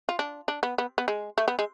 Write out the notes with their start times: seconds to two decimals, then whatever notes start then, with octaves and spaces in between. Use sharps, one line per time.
0.09 F4
0.19 D4
0.48 D4
0.63 B3
0.78 B3
0.98 B3
1.08 G#3
1.38 A3
1.48 B3
1.59 G#3